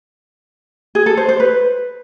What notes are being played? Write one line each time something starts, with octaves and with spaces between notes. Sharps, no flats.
G#4
A4
C5
C5
B4